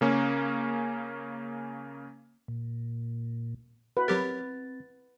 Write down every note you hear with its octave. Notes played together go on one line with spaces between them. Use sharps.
C#3 A#3 C#4
A#2
F#4 B4
F#3 C4 G4 A#4 A6